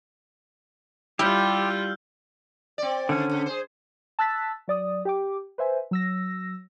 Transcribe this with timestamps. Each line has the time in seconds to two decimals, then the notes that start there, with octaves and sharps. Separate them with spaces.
1.19 G3 E4 F4 G4 E6 F6 G6
2.78 C4 D5
3.09 D3 D#3 C#4
3.31 C#3
3.46 G#4 C5
4.19 A5 E6 F#6 A6 B6
4.68 F#3 D5 D#6
5.05 G4 G5 D6
5.58 B4 C5 E5 G#5
5.91 F#3 E6 A#6